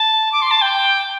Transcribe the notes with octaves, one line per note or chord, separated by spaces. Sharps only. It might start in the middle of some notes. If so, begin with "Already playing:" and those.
Already playing: A5
D6
C6
A5
G5